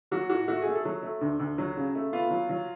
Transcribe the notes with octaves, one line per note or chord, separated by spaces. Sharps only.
F#3 F#4
A2 F#4
A3 F#4
A3 G#4
A4
F#3
A3
D2
D2
F#3
C#3
A3
B3 F4
F#3
F#3